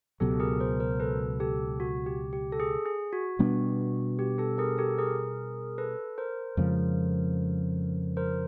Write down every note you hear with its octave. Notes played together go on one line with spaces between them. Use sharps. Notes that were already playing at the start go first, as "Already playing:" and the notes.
C#2 B2 F#3 G4 A4
G#4 A#4
A#4 C5
A#4 C5
A4 B4
G4 A4
F#4
G4
G4
A4
G#4
G#4
F#4
B2 G3 B3 D4
G4
G4 A4
G#4 A#4
G4 A4
G#4 A#4
A4 B4
A#4 C5
F2 C#3 F3 G#3
A#4 C5